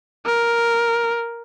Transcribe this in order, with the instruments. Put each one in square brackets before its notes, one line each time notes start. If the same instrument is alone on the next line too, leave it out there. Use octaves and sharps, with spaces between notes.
[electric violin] A#4